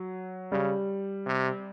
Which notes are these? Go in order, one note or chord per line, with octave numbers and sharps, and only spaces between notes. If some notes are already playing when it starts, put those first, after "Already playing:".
Already playing: F#3
C#3 G3
C3